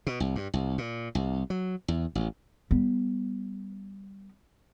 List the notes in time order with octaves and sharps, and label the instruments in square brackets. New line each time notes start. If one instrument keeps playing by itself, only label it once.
[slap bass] B2
C2
G2
C2
A#2
C2
F#3
E2
A1
[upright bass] G3 B3